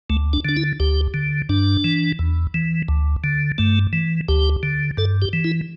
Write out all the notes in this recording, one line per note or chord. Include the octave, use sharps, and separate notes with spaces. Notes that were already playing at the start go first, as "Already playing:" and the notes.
D2 A3
D4
D3 D4
E4
D2 G4
D3
G2 D4
E3
E2
E3
D2
D3
G2 A3
E3
D2 G4
D3
G2 A4
G4
E3
E4